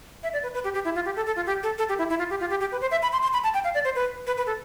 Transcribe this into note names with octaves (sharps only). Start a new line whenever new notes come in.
E5
D5
B4
B4
G4
G4
E4
F4
G4
A4
A4
F4
G4
A4
A4
G4
E4
E4
F4
G4
F4
G4
G4
B4
C5
E5
B5
C6
C6
B5
A5
G5
F5
D5
C5
B4
B4
B4
A4